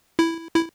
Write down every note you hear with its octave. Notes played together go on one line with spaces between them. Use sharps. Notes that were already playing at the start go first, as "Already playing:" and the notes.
E4
E4